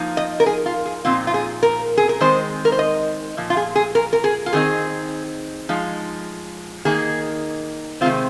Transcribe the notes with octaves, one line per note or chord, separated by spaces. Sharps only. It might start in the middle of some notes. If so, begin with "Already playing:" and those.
Already playing: F3 A#3 D#4
D#5
A#4
G#4
F4
G#4
A#2 F3 C4 D#4 F4
F4
G#4
A#4
G#4
A#4
D#3 G#3 C4 D#4 C5
A#4
C5
D#5
A#2 F3
F4
G#4
G#4
A#4
A#4
G#4
F4
D#3 C4 D#4 G#4
F3 G#3 D#4
D#3 A#3 D#4 G#4
C3 D#3 G#3 C4 F4